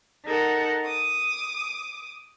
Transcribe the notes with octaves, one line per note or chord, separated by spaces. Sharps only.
D#4 A4 A#4 F#5
D6 D#6